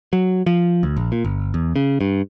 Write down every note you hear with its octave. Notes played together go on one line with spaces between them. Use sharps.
F#3
F3
D2
A#1
A#2
G1
E2
C#3
G2